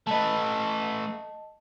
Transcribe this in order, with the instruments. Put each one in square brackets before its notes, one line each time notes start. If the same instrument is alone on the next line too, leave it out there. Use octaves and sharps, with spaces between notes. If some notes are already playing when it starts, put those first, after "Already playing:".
[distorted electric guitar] A3 B4 [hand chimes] D#5 A5